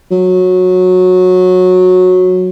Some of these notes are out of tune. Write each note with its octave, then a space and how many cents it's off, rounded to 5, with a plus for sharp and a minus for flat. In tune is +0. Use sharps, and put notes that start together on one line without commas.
F#3 -15